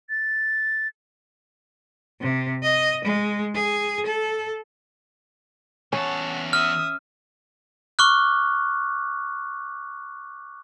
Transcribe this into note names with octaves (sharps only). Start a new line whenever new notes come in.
A6
C3
D#5
G#3
G#4
A4
E2 C#4 F#5 A5
E5 D#6 F6
C#6 D6 F6 F#6